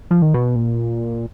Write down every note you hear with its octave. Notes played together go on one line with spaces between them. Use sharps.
F3
D#3
B2
A#2